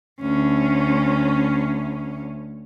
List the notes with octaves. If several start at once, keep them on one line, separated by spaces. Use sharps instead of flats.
D2 C#4